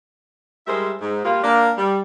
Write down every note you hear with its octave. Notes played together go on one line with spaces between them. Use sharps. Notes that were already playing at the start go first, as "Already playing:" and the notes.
G3 G#3 E4 A#4 C5 E5
G#2
G3 A#3 F4
A#3 D4
G3